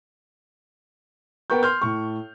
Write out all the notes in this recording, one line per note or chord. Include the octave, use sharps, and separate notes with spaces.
B3 A#4 G5 C#6 G6
C6 F6 G6
A2 C#6